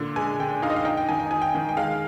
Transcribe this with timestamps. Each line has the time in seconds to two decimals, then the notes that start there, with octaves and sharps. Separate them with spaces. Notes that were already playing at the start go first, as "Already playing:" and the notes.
Already playing: A#2 D3
0.16 G#3 G#5
0.40 D3 G5
0.62 D#4 F5
0.70 D#5
0.76 F5
0.85 D#4 G5
0.97 G5
1.09 D#3 G#5
1.20 G5
1.31 D#4 G#5
1.42 G5
1.55 D#3
1.69 G5
1.77 G#3 F5